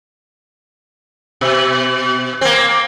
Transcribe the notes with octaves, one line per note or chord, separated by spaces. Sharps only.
B2
A#3 C4